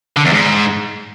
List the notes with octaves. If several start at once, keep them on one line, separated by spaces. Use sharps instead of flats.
D3
E2
G#2